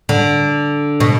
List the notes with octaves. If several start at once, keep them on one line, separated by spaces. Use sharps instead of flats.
D3
B2